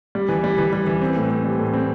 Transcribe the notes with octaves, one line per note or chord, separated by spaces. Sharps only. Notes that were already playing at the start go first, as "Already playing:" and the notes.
G3
E3
G3
E3
G3
E3
C4
A2
C4
G3
A2
C4